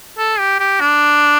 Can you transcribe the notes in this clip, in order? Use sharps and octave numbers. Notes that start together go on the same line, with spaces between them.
A4
G4
G4
D4